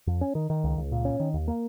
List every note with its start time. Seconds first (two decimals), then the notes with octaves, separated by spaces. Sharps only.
0.07 F2
0.21 C#4
0.35 D#3
0.50 D#3
0.64 C#2
0.77 C#2
0.92 A#2
1.05 C#4
1.20 D#3
1.34 D#2
1.48 A#3